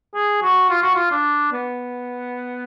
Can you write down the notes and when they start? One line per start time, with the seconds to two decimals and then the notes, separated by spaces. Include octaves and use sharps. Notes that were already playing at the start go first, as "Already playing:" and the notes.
0.14 G#4
0.42 F#4
0.70 F4
0.82 F#4
0.95 F4
1.11 D4
1.52 B3